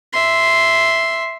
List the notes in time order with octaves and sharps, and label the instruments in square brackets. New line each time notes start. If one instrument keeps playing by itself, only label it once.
[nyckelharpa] E5 C6